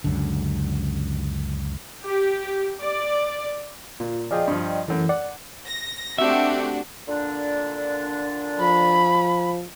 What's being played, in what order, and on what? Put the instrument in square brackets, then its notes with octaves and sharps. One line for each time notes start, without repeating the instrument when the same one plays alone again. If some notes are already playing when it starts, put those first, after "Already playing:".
[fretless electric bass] C#2 F#2 D3
[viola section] G4
D5
[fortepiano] A#2 [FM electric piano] F4
[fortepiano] F3 F4 G#4 [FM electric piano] D5 D#5 G5
[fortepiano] G2 F3
[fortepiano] F#2 A3 [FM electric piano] E3
[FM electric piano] D5 [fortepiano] F#5
[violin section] A#6
[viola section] A3 G4 [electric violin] C4 [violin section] D4 F#4 [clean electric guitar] E5
[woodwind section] A#2 D3 D4
[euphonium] F3 [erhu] B5